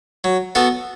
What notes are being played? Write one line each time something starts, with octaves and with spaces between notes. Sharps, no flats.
F#3
B3 F#4 A4